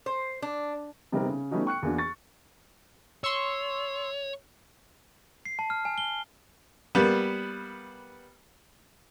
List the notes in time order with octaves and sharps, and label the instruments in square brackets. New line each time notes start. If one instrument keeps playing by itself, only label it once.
[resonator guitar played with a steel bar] C5
D4
[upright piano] C3 G3 B3 C4 D#4 A#4
C#3
G3 A3 B3 C#4 D#4 F#4
G5 C#6 F#6 C#7
E2 A#3 D4 F#4
C#6 A6
[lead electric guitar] C#5 [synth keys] C6 C#6 E6
[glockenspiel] C7
A5
F6
G#5
G7
[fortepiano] G3 A#3 B3